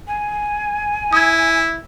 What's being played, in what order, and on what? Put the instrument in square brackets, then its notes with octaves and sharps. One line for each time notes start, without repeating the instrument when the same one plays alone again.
[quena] G#5
[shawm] E4 [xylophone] D#6 G#6